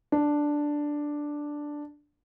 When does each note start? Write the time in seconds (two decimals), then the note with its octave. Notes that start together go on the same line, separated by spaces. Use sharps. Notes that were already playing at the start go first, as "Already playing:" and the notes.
0.12 D4